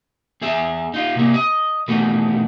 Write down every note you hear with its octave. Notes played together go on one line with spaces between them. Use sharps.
E2 G#4 E5
D#4 F4
C3 G#3 A#3
D#5
B2 D#3 E3 A3 B3